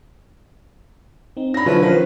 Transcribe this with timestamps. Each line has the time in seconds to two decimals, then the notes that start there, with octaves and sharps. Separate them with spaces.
1.37 C4 D#4
1.54 C#4 D4 B5 A#6
1.66 D3 F3 F#3 C#4 E4 B4
1.82 D#3 F3 B4